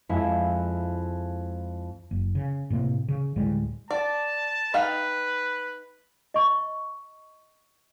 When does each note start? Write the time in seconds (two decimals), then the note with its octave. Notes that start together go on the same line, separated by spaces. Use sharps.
0.09 F2 G#3 E4
2.11 F#1
2.35 C#3
2.70 A2 C3 A#3
3.08 C#3
3.36 D2 A2 G3 G#3
3.91 D5 A5
4.74 D#4 B4 F5 G5
6.34 D#5 C#6